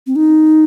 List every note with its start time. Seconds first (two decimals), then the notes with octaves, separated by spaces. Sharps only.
0.07 C4
0.16 D#4